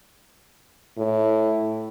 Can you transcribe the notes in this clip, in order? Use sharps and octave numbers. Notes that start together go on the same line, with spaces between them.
A2